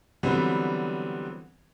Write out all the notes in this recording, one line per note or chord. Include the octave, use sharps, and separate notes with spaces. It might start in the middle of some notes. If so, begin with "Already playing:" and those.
D3 E3 F#3 G3 B3 C4